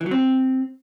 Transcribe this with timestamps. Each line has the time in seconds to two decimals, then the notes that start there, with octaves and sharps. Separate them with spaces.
0.01 E3
0.06 F#3
0.11 C4